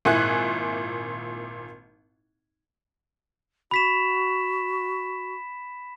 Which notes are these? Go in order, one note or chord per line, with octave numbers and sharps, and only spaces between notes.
G#1 A#2 E4 G#5 F#6 G#6
F#4 B5 B6 E7